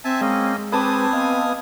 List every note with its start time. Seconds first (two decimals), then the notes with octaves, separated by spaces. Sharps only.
0.04 C4 E5 G#5 A5
0.21 G#3 A#3 C#4 D#5
0.59 G#3
0.72 C4 B4 G#5 A5 D6 D#6
1.13 B3 D#5 F5